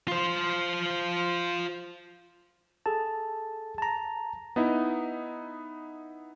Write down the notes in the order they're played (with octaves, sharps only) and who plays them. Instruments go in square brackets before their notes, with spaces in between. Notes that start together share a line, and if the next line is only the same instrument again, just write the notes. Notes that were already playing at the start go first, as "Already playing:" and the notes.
[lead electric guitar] F4 C5
[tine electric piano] G#4 A4 A5
A5 A#5
[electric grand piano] B3 D#4 E4